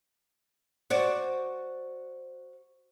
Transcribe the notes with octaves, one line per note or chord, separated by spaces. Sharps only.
F#4 C5 D5